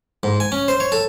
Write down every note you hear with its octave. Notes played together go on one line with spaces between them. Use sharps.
G#2
G#5
C#4
C5
C#5
A4